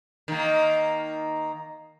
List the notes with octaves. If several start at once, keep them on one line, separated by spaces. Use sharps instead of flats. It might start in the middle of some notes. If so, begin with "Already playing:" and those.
D#3 A#3